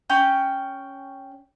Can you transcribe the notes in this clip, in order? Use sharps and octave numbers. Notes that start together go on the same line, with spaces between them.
C#4 G5